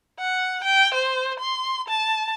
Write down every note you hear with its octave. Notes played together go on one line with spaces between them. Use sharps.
F#5
G5
C5
C6
A5